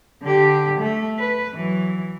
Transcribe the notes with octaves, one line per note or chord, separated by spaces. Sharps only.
D3 G4
A3
B4
E3 F#3